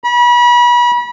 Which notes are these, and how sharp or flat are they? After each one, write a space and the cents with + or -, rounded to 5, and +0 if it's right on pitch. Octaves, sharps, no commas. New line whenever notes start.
B5 -35